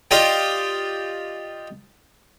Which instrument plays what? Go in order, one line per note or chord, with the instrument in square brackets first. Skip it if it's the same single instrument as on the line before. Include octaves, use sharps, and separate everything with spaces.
[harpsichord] F4 G4 D5 D#5 G5